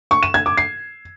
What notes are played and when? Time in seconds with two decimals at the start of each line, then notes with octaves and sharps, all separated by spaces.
0.11 C#6
0.23 E7
0.34 G#6
0.46 D6
0.57 C7